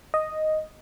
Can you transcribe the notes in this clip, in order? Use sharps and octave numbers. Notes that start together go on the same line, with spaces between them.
D#5